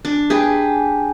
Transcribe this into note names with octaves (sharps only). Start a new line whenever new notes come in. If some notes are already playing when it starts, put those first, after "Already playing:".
D4
G4 G#4 B4